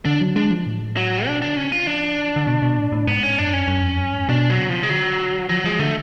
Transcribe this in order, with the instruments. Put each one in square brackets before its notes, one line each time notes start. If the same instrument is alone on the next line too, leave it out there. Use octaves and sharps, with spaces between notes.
[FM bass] D3 [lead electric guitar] D4
[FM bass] F#3
[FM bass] G#3 [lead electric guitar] D4
[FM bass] F3
A2
[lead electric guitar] F#3
[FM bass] B2 [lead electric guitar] D4
[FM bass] D3 [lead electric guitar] D4
[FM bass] C#3 [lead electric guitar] C#4
[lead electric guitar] F4
[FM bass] F3 [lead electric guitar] D4
[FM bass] D3
F3
D3
B2
B2
A2
A2
[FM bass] G#2 [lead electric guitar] B3
[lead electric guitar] C#4
[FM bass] F#2 [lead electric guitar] D4
[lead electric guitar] C#4
[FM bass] F#2
F2
F#2
G#2
[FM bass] B2 [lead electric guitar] D4
[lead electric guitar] F#3
[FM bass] C#3
[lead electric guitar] F3
G#3
[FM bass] D3 [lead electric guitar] F#3
[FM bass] F3 [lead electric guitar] F#3
[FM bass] F3 [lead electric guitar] G#3
[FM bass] D3 [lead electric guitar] A3